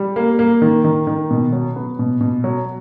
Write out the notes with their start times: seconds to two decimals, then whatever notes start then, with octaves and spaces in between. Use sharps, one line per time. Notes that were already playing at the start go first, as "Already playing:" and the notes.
Already playing: G3
0.16 A#3
0.39 A#3
0.62 D#3
0.84 D#3
1.07 D#3
1.30 B2
1.52 F#3
1.76 B3
1.99 B2
2.21 B2
2.44 F#3